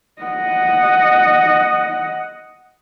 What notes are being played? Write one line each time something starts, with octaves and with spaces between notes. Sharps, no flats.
D#5 F#5